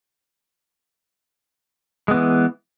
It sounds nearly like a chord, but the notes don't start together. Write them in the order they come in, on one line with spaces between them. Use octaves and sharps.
G#3 B3 E3